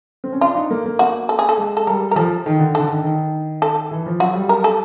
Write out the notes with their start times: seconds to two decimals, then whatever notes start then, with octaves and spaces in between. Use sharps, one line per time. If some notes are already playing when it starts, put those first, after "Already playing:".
0.24 C4
0.33 C#4
0.41 D4 F4
0.55 D#4
0.71 A#3
0.86 A#3
0.99 A#3 F#4
1.29 A4
1.39 G#4
1.49 A4
1.58 G#3
1.77 A4
1.87 G3 A#4
2.11 A#4
2.16 F3 A4
2.46 D#3
2.59 D3
2.75 D3 A4
2.89 D#3
3.04 D#3
3.62 A4
3.91 E3
4.06 F3
4.20 F#3 F#4
4.35 G3
4.49 A#4
4.64 A4